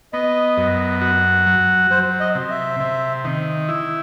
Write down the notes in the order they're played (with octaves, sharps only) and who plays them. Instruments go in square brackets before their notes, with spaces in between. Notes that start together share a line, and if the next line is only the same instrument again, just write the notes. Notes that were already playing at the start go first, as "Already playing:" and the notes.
[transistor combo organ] B3 [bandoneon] D#5
[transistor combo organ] F#2
F#4
F#3
[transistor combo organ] F#3 [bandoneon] C5
[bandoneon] D#5
[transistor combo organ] C3
[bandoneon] E5
[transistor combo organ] C3
D#3
E4